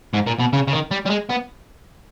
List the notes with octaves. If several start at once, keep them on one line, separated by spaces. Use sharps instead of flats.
G#2
A#2
B2
C#3
C#3
D#3
G3
G3
G#3
B3